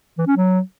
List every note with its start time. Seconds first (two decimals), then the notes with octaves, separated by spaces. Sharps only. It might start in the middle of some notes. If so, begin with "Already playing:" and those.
0.18 E3
0.27 C#4
0.37 F#3